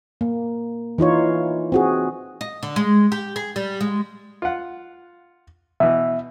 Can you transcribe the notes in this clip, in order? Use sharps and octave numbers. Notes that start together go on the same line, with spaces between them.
A#3
E3 D#4 F4 C#5
C4 F#4 G#4
D#5
D3
G#3
G4
G#4
G3
G#3
F4 F#5
B2 E3 E5